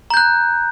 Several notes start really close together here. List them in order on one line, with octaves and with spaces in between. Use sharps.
A#5 G6 F#6